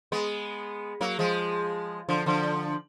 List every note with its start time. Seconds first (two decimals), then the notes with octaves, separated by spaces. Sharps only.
0.12 G#3 B3
1.01 F#3 A#3
1.19 F3 G#3
2.09 D3 F3
2.26 D3 F3